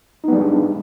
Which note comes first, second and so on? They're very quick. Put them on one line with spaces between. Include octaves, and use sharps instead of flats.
D#4 B3 G3 G#3 D4